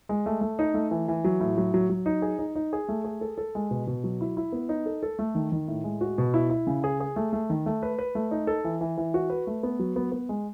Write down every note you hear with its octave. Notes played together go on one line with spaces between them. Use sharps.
G#3
A3
A3
D#4
A3
E3
E3
F#3
A2
F#3
F#3
F#3
D#4
G#4
D#4
D#4
G#4
A3
G#4
A4
A4
G#3
B2
B2
F#3
E4
E4
B3
D#4
A4
A4
A3
D#3
D#3
A2
G#3
F#4
B2
E4
E4
C#3
G#4
G#4
A3
A3
D#3
A3
B4
B4
A3
D#4
A4
E3
E3
E3
F#4
B4
A3
B3
F#3
B3
B3
G#3